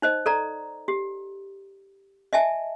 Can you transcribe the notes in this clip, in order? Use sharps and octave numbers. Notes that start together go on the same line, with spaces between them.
D#4 C5 D#5
A4 D5 A#5
G4
D#5 E5 G#5 A5